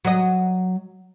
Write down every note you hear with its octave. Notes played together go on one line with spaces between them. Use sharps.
F#3 D#5